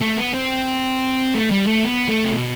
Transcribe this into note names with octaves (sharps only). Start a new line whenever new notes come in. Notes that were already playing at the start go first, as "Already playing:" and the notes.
A3
B3
C4
A3
G3
A3
B3
A3
C3
B2